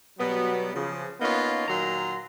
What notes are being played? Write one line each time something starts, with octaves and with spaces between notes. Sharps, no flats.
B2 F#3 G3 B3
C#3 F3
A#3 B3 C#4 D#4 F4
A#2 D#3 F#3 A#5 C6